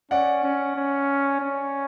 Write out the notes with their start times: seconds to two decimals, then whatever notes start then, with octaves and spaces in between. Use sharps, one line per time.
0.11 C#4 D5 F#5
0.43 C#4
0.75 C#4
1.40 C#4